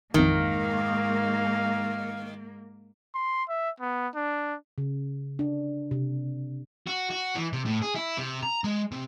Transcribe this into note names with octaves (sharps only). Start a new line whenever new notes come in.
A1 F2 G#2 D#3 A#3 F5
C6
E5
B3
D4
C#3
D4
C3
F#4
F#4
E3
C3
A2
G#4
E4
C3
A#5
G#3
C3